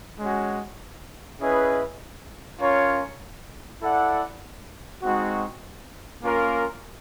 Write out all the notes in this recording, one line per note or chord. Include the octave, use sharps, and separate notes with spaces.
G#3 C#4 F#4
C#4 E4 G#4 B4 D#5
C#4 F4 A#4 C#5
E4 A4 D5 F#5
G#3 C4 D#4 F#4
A#3 C#4 F4 A#4